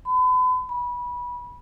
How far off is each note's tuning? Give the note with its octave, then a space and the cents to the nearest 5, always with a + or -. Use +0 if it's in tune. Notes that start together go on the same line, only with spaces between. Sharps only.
B5 +40
B5 -20